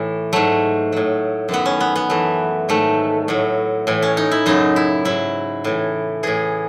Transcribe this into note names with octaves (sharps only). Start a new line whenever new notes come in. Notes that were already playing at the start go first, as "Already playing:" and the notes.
Already playing: A2 E3 A3
G#2 F#3 A3
A2 F#3
F#2 D#3 F#3 B3
C#4
B3
B3
F#2 E3 A3
G#2 D#3 F#3 A3
A2 F#3
A2 E3
C#4
D#4
E4
F#2 C#3 F#3 D#4
E4
G#2 F#3 E4
A2 E3
A2 E3 G#4